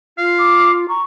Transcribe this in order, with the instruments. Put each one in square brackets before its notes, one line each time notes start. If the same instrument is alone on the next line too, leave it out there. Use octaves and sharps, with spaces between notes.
[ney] F4 [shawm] F5
[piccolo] D6
[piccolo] A#5 [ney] C#6